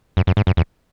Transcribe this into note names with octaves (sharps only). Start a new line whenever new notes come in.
F#2
F#2
G#2
F#2
E2